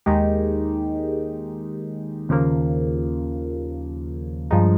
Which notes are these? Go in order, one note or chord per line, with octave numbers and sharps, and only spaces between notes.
D#2 D#3 G#3 D#4 G4
D#2 C#3 F3 A#3
G2 F3 G#3 D#4